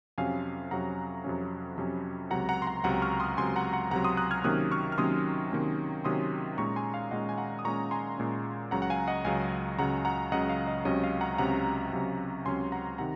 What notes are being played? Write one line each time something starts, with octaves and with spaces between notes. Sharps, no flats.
F2 C3 F#3 C#4 F5 G#5
F2 C3 F#3 C#4 F#5 A#5
F2 C3 F#3 C#4
F2 C3 F#3 C#4
C#2 C3 F#3 F#5 A#5
F#5 A#5
C6
F#5 A#5
C#2 C3 F#3 F#5 A#5
C#6 F6
C6 D#6
C#2 C3 F#3 G#5 C6
F#5 A#5
F#5 A#5
C#2 C3 F#3 F#5 A#5
C6 D#6
D#6 F#6
F6 G#6
C3 D#3 F#3 A#3 C#4 D#6 F#6
C#6 F6
F6
C3 D#3 F#3 A#3 C#4 C6 D#6
C3 D#3 F#3 A#3 C#4
C3 D#3 F#3 A#3 C#4 C6 D#6
A#2 G#3 C#4 A#5 C#6
G#5 C6
F5
A#2 G#3 C#4 D#5 F#5
G#5
F#5 A#5
D#6
A#2 G#3 C#4 A#5 C#6
G#5 C6
A#2 G#3 C#4
C#2 C#3 F#3 F#5 A#5
F#5
F5 G#5
D#5 F#5
C#2 C#3 F#3 F5 G#5
C#2 C#3 F#3 F#5 A#5
F#5 A#5
C#2 C#3 F#3 D#5 F#5
F5
D#5
C#2 C3 F#3 C#4 D#5
F5
F#5 A#5
C#2 C3 F#3 C#4 F#5 A#5
C#2 C3 F#3 C#4
C#2 C3 F#3 C#4 G#5 C6
F#5 A#5
C3 D#3 F#5 A#5